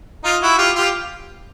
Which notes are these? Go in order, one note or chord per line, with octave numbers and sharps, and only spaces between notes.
D#4 F4
E4 F#4
F4 G4
F4 G4